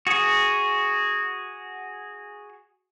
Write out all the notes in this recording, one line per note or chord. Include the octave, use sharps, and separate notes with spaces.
F#4 G#4